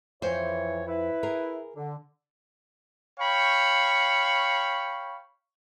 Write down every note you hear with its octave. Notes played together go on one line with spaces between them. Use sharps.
F2 E3 C5 C#5
E4 B4
G#4 A#4
D3
C#5 F5 G5 B5 C#6